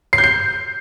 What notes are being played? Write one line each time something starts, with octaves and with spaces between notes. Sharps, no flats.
C7
G6
C7